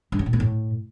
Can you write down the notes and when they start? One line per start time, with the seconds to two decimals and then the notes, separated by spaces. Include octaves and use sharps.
0.12 G2
0.19 C#3
0.26 A#2
0.33 B3
0.40 A2